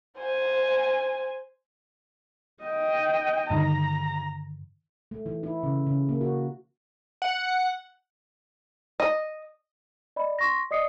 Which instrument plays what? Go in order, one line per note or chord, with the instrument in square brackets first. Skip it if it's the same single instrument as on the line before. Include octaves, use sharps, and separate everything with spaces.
[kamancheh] C5 G#5
[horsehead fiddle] D#5 G5
[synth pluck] G2 D3 D#3 [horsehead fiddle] A#5
[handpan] A3
E3
E4
C#3
C#3
A#3
F#4
[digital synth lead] F#5
[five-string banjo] D#5
[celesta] D5 D#5 B5
C6 C#6 A#6
D5 D#5 D#6 C7 C#7